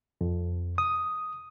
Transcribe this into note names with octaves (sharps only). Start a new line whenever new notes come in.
F2
D#6